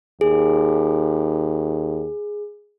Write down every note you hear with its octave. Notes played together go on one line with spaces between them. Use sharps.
D#2 G#4